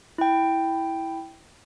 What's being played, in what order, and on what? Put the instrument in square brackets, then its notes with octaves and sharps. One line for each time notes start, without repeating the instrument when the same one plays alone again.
[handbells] E4 G5